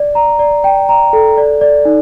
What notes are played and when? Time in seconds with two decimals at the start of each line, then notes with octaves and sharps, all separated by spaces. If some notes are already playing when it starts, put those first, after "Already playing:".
Already playing: D5
0.15 A#5
0.39 D5
0.64 G5
0.89 A#5
1.13 A4
1.38 D5
1.61 D5
1.85 D#4